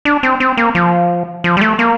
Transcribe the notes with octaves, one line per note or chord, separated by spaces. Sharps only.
D4
C4
C4
A#3
F3
F3
G3
A3
A#3